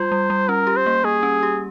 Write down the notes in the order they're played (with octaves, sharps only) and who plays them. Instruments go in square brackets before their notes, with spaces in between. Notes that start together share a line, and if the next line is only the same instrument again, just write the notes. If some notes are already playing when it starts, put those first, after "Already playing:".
Already playing: [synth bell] G3 F4 [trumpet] C5
[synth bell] G3
G3
[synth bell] C#4 [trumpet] A#4
[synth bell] G4
[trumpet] C5
[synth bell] A#3
[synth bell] A#3 [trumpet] G#4
[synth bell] C#4
G4